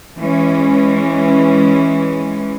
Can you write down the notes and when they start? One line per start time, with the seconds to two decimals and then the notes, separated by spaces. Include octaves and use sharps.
0.18 E3 G#3 C#4